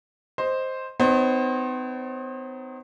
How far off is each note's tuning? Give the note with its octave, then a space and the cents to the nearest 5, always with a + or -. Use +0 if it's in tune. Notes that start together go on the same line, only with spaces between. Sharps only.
C5 +0 D#5 +0
B3 +45 D#4 -10 C5 +35